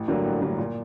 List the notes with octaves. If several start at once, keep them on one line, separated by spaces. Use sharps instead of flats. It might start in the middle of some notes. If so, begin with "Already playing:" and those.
Already playing: A1
G2 D3 F#3 A#3
A1
G2 D3 F#3 A#3
A#2